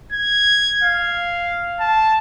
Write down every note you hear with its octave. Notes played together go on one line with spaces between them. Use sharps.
G#6
F5
A5